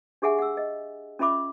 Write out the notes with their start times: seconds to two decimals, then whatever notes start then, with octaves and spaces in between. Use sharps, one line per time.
0.22 D4 G4 G#4 E5 F#5 G#5
0.38 F#5 E6
0.57 D#5
1.19 C#4 F4 E5 B5 D6